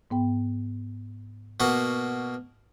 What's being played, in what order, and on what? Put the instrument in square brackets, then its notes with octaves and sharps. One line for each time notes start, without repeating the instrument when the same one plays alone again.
[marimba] G#2 B3 G5
[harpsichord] B2 A#3 F#4